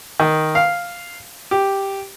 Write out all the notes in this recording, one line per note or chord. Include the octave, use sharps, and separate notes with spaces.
D#3
F5
G4